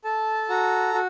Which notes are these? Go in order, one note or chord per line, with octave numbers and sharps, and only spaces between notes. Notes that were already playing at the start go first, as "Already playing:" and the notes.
A4 A5
F#4 A#5
F#4